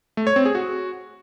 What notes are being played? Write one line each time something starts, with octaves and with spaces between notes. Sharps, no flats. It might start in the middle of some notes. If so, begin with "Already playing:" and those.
A3
C#5
C4
G#4
F#4